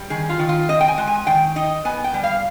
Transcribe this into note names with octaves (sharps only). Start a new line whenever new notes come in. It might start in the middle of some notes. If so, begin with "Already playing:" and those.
Already playing: G3
D#3 G#4
F4
D#3
F4
C4 D#5
G5
G#5
G#3
G#5
D#3 G5
D#4 D#5
B3 G#5
G5
G3
F5